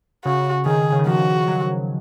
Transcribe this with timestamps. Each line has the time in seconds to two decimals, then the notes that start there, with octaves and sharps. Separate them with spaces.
0.25 C#3 F#4
0.66 D#3 G#4
0.92 C#3
0.99 D#3
1.07 F3 F#4
1.48 F#3